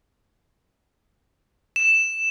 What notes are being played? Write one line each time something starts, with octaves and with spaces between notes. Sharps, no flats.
E7